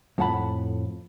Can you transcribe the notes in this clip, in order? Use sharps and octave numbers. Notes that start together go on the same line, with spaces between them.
F2 A2 F3 F#5 A5 B5